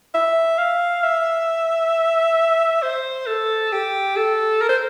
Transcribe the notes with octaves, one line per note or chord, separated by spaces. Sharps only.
E5
F5
E5
C5
A4
G4
A4
A#4
C5